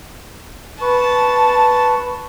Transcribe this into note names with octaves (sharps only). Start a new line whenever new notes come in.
B4 A5 C#6